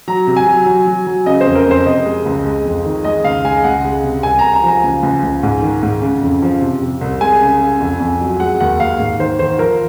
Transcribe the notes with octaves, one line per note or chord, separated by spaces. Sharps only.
F#3 A#5
C3
G#5
F#3
F#3
F#3
F#3
C#3 D#5
C5
F2
A#4
F2 C5
C3 D#5
G#3
C#2
G#3
F2
D#3
G#3 D#5
C#2 F5
G#3 G#5
C#2 F#5
G#3
C3
C2 G#5
C3 A#5
A#5
F3
G#5
C#2
C#2
C#2
G#2
D#3
G#2
C#3
F2
F3
C3
C3
C2
G#3 G#5
C#3
C#3
F2
F2
F#3
G#3 F#5
D#2 F#5
D#2 F5
G#2
D#3 C5
D#3 C5
F3 A#4